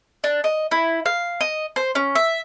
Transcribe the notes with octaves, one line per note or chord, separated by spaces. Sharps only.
D4
D#5
E4
F5
D#5
C5
C#4
E5